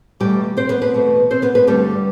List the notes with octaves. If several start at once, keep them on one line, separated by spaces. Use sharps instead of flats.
E2 B2 G3 A3 G4
C4 C5
B3 B4
B3 B4
E2 B2 A3
C4 C5
B3 B4
B3 B4
G2 D3 G3 A3 G4